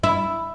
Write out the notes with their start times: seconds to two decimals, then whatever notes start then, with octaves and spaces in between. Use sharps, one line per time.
0.03 E4